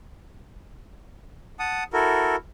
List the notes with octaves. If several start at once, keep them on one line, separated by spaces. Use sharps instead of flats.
F#5 A5 D#6
E4 F#4 A4 A#4